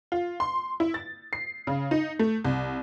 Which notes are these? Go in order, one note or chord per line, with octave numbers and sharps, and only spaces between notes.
F4
C6
E4
A6
C7
C#3
D#4
A3
C2